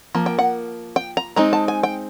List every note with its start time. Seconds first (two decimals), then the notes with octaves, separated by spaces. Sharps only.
0.15 F3 A#3
0.26 G5
0.39 F#5
0.96 G5
1.17 A#5
1.36 G#3 C4 D#4 A#5
1.53 A5
1.68 G#5
1.83 G5